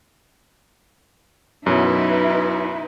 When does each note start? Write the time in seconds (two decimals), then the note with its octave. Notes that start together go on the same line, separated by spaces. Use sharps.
1.66 F#2 B2 F#3 D#4 E4 B4